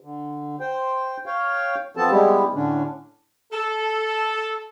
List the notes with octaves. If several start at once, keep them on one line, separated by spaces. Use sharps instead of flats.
D3
C5 G5
C#5 F5 G5
F3 B3 C4 A4 A5
G3 G#3 B3 E4 G4
A2 D3 C#4 D4
A4